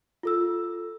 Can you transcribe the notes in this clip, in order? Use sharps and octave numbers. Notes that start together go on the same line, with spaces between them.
F4 A4 E6